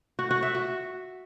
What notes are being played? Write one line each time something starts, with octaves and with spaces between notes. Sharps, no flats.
F#4
F#4
E5
F#4